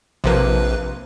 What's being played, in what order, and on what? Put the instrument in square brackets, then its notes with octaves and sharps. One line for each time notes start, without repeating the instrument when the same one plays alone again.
[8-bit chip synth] A#1 B4 [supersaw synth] C3 F3 A#3